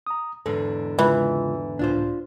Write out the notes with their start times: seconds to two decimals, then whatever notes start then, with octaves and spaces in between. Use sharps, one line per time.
0.07 A#5 D#6
0.46 E2 G#2 D3 A4
0.99 C#3 E3 G#3 F4
1.79 C#2 A2 D4 F4 C5